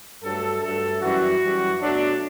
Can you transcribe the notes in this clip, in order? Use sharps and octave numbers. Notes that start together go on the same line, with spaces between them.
G2 F#3 A3 A4
G2 F#3 A3 A4
F#2 E3 G3 F#4
F#2 E3 G3
B2 F#3 A3 D4